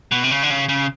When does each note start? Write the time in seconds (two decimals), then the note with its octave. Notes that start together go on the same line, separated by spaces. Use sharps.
0.12 B2
0.24 C3
0.31 C#3
0.43 D3
0.50 C#3
0.69 C#3